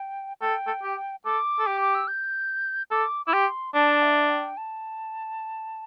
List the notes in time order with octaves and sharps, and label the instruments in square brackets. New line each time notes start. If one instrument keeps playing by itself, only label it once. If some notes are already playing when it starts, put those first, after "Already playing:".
Already playing: [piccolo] G5
[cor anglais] A4 [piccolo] G5
[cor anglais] A4
G4
[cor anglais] A4 [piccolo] D6
[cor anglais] A4
G4
[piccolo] D6
E6
G6
[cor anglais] A4 [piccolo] D6
[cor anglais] E4 [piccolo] D6
[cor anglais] G4 [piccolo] C6
[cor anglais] D4 [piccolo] A5
[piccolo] E5
G5
A5